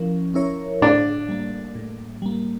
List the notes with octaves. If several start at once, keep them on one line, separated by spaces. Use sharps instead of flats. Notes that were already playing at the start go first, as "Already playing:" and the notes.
Already playing: F3 C#4 E4 A#4
C#4 E4 A#4 C#5
A2 D4
G3 A#3
A2
G3 A#3